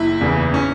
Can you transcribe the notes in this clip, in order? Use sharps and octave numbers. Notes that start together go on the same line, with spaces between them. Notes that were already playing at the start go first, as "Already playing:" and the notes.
Already playing: F#1 E4
E2 C#3 E3
C#4